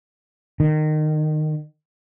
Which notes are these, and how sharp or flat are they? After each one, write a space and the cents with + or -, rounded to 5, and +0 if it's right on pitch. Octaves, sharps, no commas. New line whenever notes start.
D#3 -20